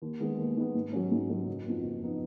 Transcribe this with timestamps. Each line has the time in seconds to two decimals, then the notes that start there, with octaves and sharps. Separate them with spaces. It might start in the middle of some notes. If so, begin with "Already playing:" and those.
0.02 D#2
0.20 D#3 G#3 B3
0.38 D#2
0.56 D#3 G#3 B3
0.75 G#2
0.93 F#3 C#4
1.11 G#2
1.29 F#3 C#4
1.47 F#1
1.65 F2 F3 B3 D#4
1.84 F#1
2.03 F3 B3 D#4